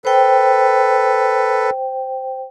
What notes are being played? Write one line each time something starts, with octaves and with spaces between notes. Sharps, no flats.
A4 B4 C5 G5